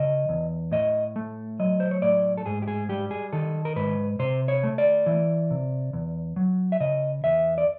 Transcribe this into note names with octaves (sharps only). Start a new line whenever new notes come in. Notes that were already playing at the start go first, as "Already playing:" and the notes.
Already playing: C#3 D#5
E2
A2 D#5
A3
F#3 D#5
C5
C#5
A2 D5
A4
G#2 G#4
G4
G#4
G3 G4
G#4
D#3 A4
A#4
G#2 B4
C3 C5
C#5
A3
D5
E3
C3
E2
F#3
E5
C#3 D#5
E2 E5
D5